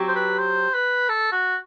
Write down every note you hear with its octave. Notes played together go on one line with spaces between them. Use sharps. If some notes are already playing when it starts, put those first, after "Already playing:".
Already playing: F#3 C4 G4
C5
B4
C5
B4
A4
F#4